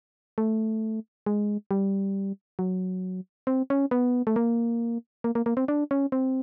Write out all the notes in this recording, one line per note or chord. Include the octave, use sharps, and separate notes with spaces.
A3
G#3
G3
F#3
C4
C#4
B3
A3
A#3
A#3
A#3
A#3
C4
D4
C#4
C4